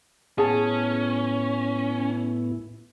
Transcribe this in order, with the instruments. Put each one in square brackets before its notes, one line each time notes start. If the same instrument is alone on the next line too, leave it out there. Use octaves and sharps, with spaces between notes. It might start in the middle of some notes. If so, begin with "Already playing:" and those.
[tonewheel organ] A2 B3 E4 [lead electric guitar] C#4 [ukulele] G#4 A5